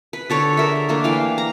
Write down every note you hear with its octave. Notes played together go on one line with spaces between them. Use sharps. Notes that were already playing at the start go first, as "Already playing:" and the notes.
B4
D3 A4 C#5
G#4 A#4 E5
A3 A#3 D4
E3 F5 G5
A#5